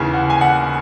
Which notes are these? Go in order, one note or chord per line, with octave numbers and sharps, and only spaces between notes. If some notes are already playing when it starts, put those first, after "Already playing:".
Already playing: D#2 C#3 E3 G#5
F#5
G#5
F#5